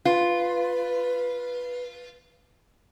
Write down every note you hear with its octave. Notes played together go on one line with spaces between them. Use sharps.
F4 B4